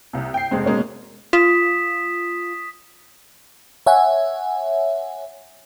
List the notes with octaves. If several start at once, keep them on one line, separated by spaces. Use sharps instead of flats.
C2 C3
G5 C7
F1 G#3 C4
B2 G#3 A#3 C#4
F4 D#6 B6 E7
C#5 E5 F#5 G#5